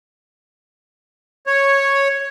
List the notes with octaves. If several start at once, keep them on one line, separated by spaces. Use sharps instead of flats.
C#5